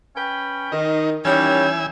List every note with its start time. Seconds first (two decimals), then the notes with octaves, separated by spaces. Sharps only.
0.16 C#4 B4 G5
0.72 D#3 D#4
1.25 D#3 E3 G3 C#4 C#5 G#5 E6